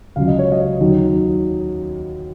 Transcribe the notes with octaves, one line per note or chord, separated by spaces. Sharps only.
C#2 C#3 F#3 F5
D#5
C#5
D#5
D#2 D#3 F#3